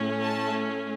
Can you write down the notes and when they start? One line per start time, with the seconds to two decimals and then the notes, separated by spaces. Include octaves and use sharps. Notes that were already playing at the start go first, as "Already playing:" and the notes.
Already playing: A2 A3 C#4
0.23 A5